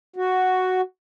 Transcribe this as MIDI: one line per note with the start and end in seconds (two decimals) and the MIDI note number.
0.16 0.81 66